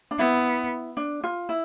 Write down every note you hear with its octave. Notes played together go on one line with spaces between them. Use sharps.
D4
B3 E4
D4
F4
E4